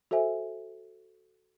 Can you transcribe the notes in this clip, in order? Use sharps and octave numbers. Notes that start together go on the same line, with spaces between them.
F#4 A4 C5 E5 G#5